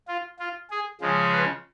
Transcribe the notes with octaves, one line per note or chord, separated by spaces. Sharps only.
F4
F4
G#4
C#3 F3 G#3
B4